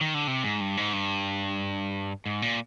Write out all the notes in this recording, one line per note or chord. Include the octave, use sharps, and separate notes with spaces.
D#3
D3
C3
G#2
G2
G#2
G2
G#2
A#2